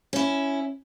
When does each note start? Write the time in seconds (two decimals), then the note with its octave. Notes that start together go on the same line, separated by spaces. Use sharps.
0.13 C#4 E4